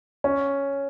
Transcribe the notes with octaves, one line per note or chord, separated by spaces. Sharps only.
C#4